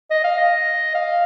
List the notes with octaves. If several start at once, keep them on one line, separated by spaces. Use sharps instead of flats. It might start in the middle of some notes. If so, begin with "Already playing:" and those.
D#5
F5
D#5
F5